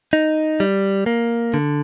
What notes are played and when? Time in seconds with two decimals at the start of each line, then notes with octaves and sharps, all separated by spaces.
0.13 D#4
0.60 G3
1.06 A#3
1.54 D3